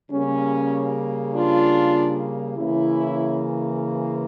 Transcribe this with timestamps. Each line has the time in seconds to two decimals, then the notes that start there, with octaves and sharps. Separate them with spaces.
0.11 C#3 G3 A#3 C#4
1.34 D4 F4
2.56 C#3 E3 A#3 C#4 E4